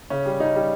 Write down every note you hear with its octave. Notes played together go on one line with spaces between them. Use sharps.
C#3 C#4
G3
C#3 D#4
G3